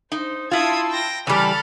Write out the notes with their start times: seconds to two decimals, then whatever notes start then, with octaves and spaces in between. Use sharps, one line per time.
0.12 D#4 C5
0.51 E4 F4 A5 C6 D#6 E6 G#6
0.91 G5 A#6
1.27 C#3 E3 G3 A4 B5 F6 A6